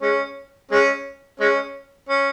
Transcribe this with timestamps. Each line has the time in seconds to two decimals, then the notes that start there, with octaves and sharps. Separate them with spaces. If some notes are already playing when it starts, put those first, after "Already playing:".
0.02 G#3 C#4
0.71 G#3 C#4
1.40 G#3 C#4
2.09 C#4